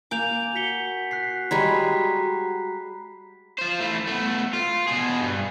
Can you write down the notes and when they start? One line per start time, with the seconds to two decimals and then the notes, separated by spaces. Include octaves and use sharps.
0.11 A#3 G#5 D6 G6 F7
0.56 F#4 B6 C#7 G7
1.11 F#6 B6 C7
1.51 G3 G#3 C#5 A#5 B5 B6
3.59 F4 C5
3.80 E3 A3
4.08 A3 B3
4.53 F4
4.87 B2 G#4
5.21 G2